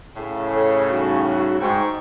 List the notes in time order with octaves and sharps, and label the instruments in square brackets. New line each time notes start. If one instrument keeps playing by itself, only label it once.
[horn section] A2 C#3
[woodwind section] A4 C#5
G3 D#4 F#4
[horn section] G#2 [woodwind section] G5 C#6